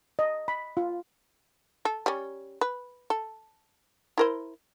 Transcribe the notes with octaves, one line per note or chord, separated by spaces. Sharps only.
D#5
B5
F4
A4
G3 C#4
B4
A4
E4 A#4 C5